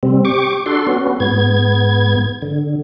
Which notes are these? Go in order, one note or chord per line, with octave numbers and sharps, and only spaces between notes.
C3 G3 C4
G4 C#6 D6
D4 F#4 A4 C6
B3 C#4 F#4
G#2 B3 G#6
D3